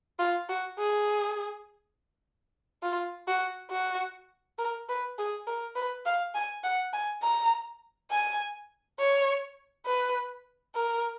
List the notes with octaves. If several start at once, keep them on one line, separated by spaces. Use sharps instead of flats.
F4
F#4
G#4
F4
F#4
F#4
A#4
B4
G#4
A#4
B4
F5
G#5
F#5
G#5
A#5
G#5
C#5
B4
A#4